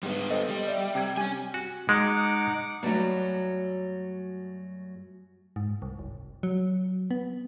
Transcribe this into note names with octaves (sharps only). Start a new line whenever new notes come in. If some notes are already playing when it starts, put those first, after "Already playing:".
G#2 G3 B3
A4 C5 D#5
G3
D5 E5
C3 G#6
C#4 G4 G#5
F#4
G#3 D#4 F#5 D6
F#2 F#3 G3 A3 A#3
G#2
C2
F#1
F#3
B3